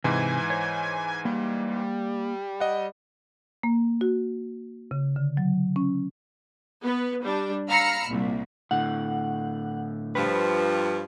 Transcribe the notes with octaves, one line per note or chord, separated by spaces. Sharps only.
G#2 C3 E3 G#5
C5 C#5
G3 A#3
D#5 F#5
A#3
F#4
C#3
D3
F#3
C#4
B3 B4
G3 D4
F5 A#5 B5 E6 F6 C#7
C2 A#2
A2 D3 F#5
G2 F3 B4